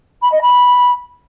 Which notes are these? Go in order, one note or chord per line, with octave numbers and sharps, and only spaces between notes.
B5
D#5
B5